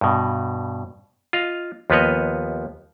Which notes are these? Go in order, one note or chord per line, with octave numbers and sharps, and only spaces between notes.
G2 B2
F4 D#5 F5
D#2 F3 B3 B4 C#5 D#5